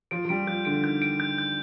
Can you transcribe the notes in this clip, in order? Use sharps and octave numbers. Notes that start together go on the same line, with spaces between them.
F3 D7
F3
G3 D7
F3 G6
D3 D7
D#3 G6
D7
G6
G6